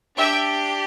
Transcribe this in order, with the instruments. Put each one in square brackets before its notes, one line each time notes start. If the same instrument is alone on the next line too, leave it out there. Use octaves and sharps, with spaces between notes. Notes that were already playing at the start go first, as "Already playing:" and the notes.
[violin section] D4 G4 E5 G5